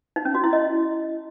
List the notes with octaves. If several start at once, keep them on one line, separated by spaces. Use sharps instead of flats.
D#4
C#4
F#4
E4
D#5